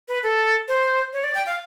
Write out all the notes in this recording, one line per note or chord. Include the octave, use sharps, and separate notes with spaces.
B4
A4
C5
C#5
D5
G5
F5